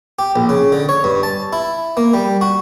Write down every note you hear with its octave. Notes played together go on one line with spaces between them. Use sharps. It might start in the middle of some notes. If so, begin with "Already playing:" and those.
G4
A#1
C#3
D3
C#5
G2
A5
E4
A#3
G3
F#4